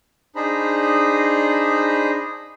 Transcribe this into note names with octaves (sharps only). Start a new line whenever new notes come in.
D4 D#4 G#4 C5 A#5 B5